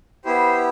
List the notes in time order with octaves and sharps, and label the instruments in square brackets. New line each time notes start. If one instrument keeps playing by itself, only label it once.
[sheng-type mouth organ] B3 E4 G4 C5